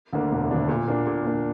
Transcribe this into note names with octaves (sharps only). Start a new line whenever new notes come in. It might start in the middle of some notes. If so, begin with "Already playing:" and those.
D2 D3 A#3 D4
E1
D2 D3 A#3 D4
A#2
A#3 D4
A#2
A#3 D4